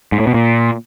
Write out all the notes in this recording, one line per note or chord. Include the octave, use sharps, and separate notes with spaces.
G#2
A2
B2
A#2